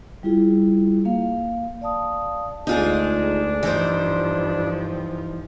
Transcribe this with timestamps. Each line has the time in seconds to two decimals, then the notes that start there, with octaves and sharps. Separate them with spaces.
0.23 G3 E4 F4 G#4
1.05 A#3 F5
1.81 D5 F5 A5 D#6
2.67 D2 G#3 D4 D#4 F4 G#4
3.63 G2 E3 F3 D#4 C5